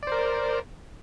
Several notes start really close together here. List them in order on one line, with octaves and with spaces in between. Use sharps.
D5 C5 A#4